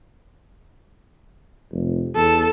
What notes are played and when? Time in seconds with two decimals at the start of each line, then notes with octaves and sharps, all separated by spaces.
1.72 F1
2.16 E2 A4